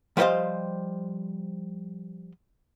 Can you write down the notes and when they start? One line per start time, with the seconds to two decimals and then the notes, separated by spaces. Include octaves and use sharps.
0.17 F3 G3 B4 C5 D#5 F5